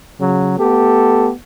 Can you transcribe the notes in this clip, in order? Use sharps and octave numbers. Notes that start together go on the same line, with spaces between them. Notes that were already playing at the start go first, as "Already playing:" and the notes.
C#3 F#3
A3 B3 G4 A4